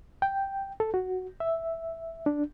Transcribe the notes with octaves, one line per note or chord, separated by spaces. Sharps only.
G5
A4
F#4
E5
D4